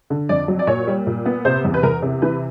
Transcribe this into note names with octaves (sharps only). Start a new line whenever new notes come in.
D3
F2 D5
F#3
D5
A#2 C#5
G3
A#2
B3
C3 C5
E2
B4
E2 A#4
C3
E3 B4